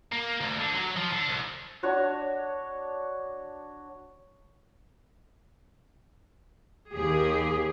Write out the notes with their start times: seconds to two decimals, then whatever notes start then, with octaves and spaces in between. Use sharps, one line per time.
0.12 A#3
0.41 D2
0.59 D3
0.75 F#3
0.96 F3
1.13 D3
1.29 C2
1.83 D4 F#4 C#5
6.92 D#2 G4 G#4